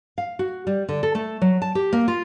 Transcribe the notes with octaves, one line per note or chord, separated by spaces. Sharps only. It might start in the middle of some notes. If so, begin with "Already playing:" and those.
F5
F#4
G3
D3
A4
A3
F#3
A5
G4
A#3
F4